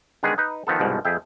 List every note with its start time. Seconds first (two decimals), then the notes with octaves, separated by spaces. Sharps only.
0.23 D3 D#3 G#3 B3 G#4
0.38 D#4 B4
0.67 D#3 F3 B3 A4
0.79 C2 G#2 B2 F3
1.05 F2 G#4 E5 G5